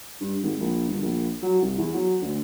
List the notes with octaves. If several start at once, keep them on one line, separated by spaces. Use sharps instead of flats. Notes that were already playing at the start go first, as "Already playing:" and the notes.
G2
G#1
A#1
G1
A#1
F#3
C2
E2
F#3
D2